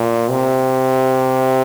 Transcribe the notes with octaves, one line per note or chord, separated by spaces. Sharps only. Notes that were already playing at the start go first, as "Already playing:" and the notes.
Already playing: A#2
C3